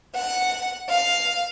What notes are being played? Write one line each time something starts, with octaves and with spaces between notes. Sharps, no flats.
F#5
F5